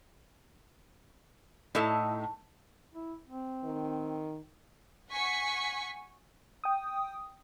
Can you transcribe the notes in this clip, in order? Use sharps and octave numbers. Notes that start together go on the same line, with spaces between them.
A2 D#4 E4 A4
E4
C4
D#3
F#5 G#5 C#6 B6
G5 D#6